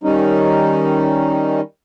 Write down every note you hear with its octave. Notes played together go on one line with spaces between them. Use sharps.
D#3 G3 C#4 D#4